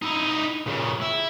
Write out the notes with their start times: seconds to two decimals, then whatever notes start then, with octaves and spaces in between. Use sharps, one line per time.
0.02 D#4 E4
0.66 A#2 C#3
1.01 E4